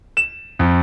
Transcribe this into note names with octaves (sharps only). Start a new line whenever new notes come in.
E7
F2